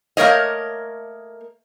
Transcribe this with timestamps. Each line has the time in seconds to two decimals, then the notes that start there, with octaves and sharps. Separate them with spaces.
0.17 A3 A#3 A#4 C#5 D#5